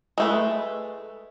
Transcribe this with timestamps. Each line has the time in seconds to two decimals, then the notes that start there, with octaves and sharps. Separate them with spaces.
0.18 G#3 A3 B4